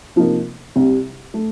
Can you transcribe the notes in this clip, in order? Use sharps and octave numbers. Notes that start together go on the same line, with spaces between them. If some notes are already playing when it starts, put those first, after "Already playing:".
C3 F3 A#3 D#4 A#4
C2 C3 G3
A3